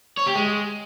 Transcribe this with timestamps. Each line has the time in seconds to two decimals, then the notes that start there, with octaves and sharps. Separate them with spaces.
0.17 C#5
0.26 G4
0.35 G#3